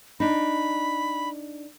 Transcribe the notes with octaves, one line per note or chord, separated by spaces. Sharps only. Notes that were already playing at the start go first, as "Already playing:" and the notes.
D4 D#4 B5